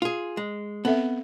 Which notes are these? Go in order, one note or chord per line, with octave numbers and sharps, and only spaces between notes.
F4 G#4
G#3
B3 C4 A4 E5